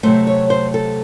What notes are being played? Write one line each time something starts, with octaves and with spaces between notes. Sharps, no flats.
C3 F#3 A3 C5
C#5
C5
A4